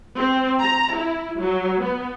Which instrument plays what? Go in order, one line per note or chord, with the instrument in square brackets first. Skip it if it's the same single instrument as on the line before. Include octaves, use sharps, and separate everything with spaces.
[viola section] C4
A#5
E4
F#3
B3